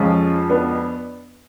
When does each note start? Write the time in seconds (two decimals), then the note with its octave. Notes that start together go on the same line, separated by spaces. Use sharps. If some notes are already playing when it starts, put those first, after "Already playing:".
Already playing: F2 F3 G#3 C#4 F4
0.50 B3 D4